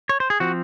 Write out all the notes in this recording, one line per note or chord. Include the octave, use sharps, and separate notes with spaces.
C#5
C5
G#4
F3 C4 F#4